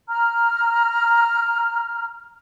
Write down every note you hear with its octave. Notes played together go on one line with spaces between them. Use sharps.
A#5 F6